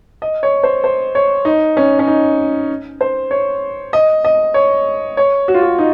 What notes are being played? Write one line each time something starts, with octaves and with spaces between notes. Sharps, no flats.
D#5
C#5
C5
C5
C#5
D#4
C#4
C#4
D#4
C5
C#5
D#5
D#5
C#5
C#5
F#4
F4
F#4
D#4